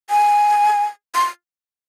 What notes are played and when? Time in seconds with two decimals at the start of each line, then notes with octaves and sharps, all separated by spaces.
0.10 G#5
1.15 C6